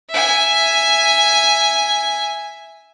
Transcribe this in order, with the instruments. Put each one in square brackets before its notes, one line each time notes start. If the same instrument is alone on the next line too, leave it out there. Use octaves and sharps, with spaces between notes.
[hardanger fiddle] E5 G#5